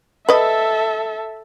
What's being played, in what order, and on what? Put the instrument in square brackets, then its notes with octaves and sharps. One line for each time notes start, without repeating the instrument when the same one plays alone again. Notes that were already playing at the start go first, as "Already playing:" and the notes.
[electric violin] A4 E5 [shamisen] B4 D#5